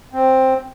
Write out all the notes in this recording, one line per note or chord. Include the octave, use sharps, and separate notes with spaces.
C4